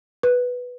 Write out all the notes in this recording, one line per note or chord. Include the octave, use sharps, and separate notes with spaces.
B4